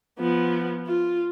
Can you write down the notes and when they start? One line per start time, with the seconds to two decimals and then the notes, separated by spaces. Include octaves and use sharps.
0.19 F3 B3
0.87 F4